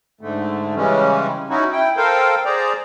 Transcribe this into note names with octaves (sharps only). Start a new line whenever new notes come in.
G#2 D3 A3
C#3 E3 G3 G#3 C#4
C#4 D#4 E4 F#4
E4 G5
A4 A#4 C5 F5 G5
G#4 C5 D5 A#5